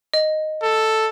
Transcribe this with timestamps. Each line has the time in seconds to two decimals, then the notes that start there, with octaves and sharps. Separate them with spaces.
0.14 D#5
0.63 A4